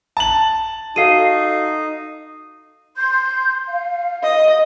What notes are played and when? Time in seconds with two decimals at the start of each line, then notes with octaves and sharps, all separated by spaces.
0.17 A5 F#7
0.96 D#4 F#4 A4 F5 C7 D#7
2.97 C6 G6
3.68 F5
4.23 D#5